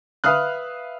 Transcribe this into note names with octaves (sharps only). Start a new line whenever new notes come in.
B4 E5 F5 D#6 F6 F#6